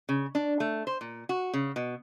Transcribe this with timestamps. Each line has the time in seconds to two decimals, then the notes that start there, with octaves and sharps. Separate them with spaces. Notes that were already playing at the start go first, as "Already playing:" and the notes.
0.09 C#3
0.35 D4
0.60 A3
0.87 C5
1.01 A#2
1.29 F#4
1.54 C#3
1.76 B2